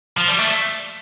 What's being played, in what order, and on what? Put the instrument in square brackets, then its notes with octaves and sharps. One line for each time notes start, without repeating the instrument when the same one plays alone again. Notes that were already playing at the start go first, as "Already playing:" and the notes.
[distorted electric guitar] F3
G3
A3